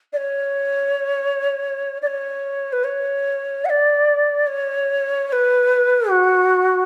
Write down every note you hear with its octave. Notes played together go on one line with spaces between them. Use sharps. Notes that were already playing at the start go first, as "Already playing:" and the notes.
D5
C#5
D5
C#5
B4
C#5
F#5
D5
C#5
C#5
B4
F#4